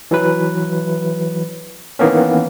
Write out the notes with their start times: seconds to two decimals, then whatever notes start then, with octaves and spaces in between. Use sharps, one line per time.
0.11 E3 F#3 B4
1.99 D#3 E3 A#3 B3 C#4